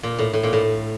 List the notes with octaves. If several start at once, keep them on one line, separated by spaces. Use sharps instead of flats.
A#2
A2
A2
A#2
A2